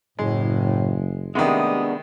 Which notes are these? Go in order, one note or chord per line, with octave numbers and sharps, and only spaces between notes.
F#1 A2 G#3
C3 D#3 G#3 A3 B3 D4 G4 D#6